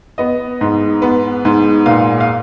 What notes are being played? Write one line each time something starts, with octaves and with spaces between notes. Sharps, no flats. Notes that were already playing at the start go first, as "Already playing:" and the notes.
B3 D#5
G#2
B3
G#2
A#2 F5
F5